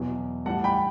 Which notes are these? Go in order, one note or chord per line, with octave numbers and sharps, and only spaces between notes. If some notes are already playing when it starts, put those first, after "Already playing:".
Already playing: E2 B2 F#3
A2 E3 G3 F#5 A5
G5 B5